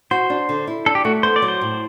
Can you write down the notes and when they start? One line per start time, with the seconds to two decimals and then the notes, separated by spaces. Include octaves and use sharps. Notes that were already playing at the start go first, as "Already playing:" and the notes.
0.11 F#4 C5
0.30 D4
0.49 D3
0.67 E4
0.86 D4 A4
0.95 G4
1.05 A3 F#4
1.23 B3 C5
1.36 D5
1.42 F#3
1.48 C5
1.61 A2